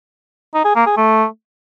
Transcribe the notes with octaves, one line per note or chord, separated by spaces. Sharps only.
D#4
G#4
A#3
G#4
A3